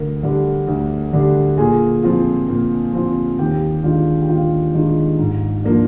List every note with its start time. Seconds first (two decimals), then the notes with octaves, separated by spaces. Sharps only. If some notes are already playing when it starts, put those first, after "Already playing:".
Already playing: D2 A#4
0.23 D3 G3 D4
0.67 D2
1.13 D3 G3 D4
1.58 A#2 G#4 G#5
2.03 F3 C4 F4
2.48 A#2
2.93 F3 C4 F4
3.38 D#2 G4 G5
3.83 D#3 G#3 D4 F4 F5
4.21 G5
4.29 D#2 F4 F5
4.74 D#3 G#3 D4 F4
5.19 G#2
5.64 F3 A#3 D4